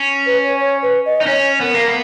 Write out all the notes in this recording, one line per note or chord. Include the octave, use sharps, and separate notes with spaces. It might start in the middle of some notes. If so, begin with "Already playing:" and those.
Already playing: C#4
B4
C#5
C#5
B4
D#5
D#4
C#4 C#5
B3 A#4
A#3
B3